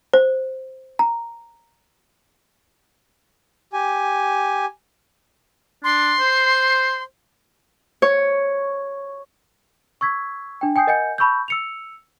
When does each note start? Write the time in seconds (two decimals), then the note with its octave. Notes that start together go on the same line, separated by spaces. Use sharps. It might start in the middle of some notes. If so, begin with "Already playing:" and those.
0.14 C5
0.99 A#5
3.73 G4 G#5
5.84 D4 C6
6.20 C5
8.02 C#5
10.01 C#6 E6 G#6 B6
10.61 D4 G5
10.76 G5 G#5 D#6 G6 C7
10.87 A#4 D#5 F#5 G#5 G6 C#7
11.18 A5 B5 C#6 E6 G6
11.48 E6 C#7 F7